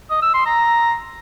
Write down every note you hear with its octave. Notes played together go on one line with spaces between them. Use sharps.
D#5
E6
C6
A#5